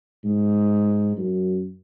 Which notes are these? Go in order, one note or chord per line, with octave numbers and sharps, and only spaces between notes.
G#2
F#2